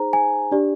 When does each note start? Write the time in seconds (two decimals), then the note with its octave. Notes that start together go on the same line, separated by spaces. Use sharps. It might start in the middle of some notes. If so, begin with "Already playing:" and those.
Already playing: D#4 G#4 C5 A#5
0.13 G#5
0.51 D4 G4 D5